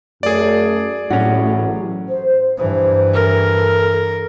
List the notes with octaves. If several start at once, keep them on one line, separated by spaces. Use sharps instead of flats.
F#2 A3 G#4 D5
A1 A2 F#3 C#4 F#4
C5
G2 E3 C5
A4 A#4